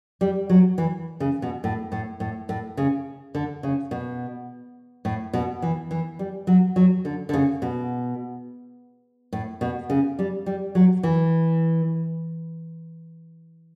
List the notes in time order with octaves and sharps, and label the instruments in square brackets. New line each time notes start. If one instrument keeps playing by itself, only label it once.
[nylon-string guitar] G3
F#3
E3
C#3
B2
A2
A2
A2
A2
C#3
D3
C#3
B2
A2
B2
E3
E3
G3
F#3
F#3
D3
D3
C#3
B2
A2
B2
C#3
G3
G3
F#3
E3